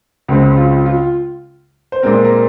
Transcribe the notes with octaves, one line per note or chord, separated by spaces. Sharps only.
C#2 C#3 G#3 C4
F4
F4
C5
A#2 G#3 C4 A#4
A#4